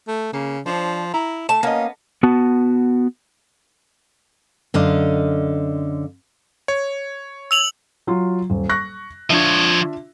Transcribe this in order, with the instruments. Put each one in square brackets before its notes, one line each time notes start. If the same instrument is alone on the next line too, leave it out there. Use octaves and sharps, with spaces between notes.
[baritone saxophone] A3
[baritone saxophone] C#3 [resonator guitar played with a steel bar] A#3
[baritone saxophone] F3 [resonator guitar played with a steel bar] D4 C5 C#5
[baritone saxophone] E4 [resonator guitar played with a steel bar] A#5
[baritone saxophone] A3 [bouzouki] A5
[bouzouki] A#3 [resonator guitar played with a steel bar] B3 D#5 [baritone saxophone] C#4
[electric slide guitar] B3 F#4 A5
[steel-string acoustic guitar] F#2 D3 D#5 F5
[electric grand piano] C#5
[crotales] E6 F7 F#7
[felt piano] F#3 F4
D#1
C#6 F#6 A#6
[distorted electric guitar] F3 C#5 [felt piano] D4 F4 E5